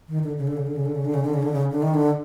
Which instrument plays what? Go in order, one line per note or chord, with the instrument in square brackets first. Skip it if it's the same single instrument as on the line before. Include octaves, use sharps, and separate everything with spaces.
[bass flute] D#3
D3
C#3
D3
C#3
D3
C#3
D3
C#3
D3
C#3
D3
C#3
D3
C#3
D3
D#3
D3